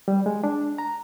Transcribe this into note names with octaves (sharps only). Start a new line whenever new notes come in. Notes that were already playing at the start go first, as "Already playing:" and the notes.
G3
G#3
D4
A#5